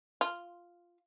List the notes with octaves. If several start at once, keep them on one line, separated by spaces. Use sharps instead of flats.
F4